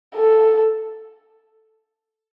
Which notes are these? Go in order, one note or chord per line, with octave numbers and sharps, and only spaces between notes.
A4